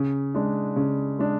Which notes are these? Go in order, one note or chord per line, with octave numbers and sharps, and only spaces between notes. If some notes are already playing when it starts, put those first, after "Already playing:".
Already playing: C#3
G#3 D4
C#3
G#3 D4